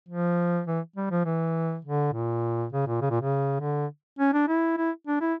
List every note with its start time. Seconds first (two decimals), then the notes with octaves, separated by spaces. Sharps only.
0.08 F3
0.67 E3
0.96 G3
1.11 F3
1.25 E3
1.84 D3
2.13 A#2
2.72 C#3
2.87 A#2
3.01 C#3
3.10 A#2
3.21 C#3
3.60 D3
4.19 C#4
4.33 D4
4.48 E4
4.77 E4
5.07 D4
5.21 E4